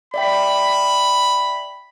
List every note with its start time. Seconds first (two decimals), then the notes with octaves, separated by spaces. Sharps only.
0.14 D5 E5 G5 B5